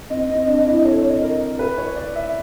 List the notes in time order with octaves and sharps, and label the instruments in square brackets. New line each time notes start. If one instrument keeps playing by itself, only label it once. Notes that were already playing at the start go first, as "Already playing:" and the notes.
[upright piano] C4 [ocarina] D#5
[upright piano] C4
D4
E4
[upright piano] A4 [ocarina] C#5
[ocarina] D#5
[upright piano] A#4
B4
C#5
D5
E5